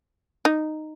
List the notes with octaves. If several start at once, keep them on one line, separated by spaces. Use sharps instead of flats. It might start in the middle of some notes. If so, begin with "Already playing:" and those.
D#4